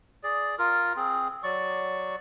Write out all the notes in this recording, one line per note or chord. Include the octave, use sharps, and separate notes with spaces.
G#4 D5
F4 A#4
C4 G#4
F#3 D5 C#6